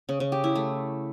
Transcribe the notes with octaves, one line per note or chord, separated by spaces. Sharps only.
C#3
C#3
G4
E4
A3